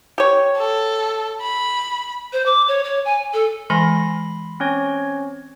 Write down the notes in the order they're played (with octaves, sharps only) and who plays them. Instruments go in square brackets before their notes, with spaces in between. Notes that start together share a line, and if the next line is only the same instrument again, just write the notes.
[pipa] G4 C#5
[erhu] A4
B5
[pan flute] C5
D6
C#5
C#5
G#5
A4
[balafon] E3 G#3 G#5 [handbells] B5 C6 A#6
[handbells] C4 C#4 C#5